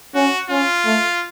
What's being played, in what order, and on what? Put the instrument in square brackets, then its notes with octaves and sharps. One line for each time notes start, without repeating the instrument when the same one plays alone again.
[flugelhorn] C#4 [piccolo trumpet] F#4
[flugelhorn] C#4 [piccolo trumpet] F4
[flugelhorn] A3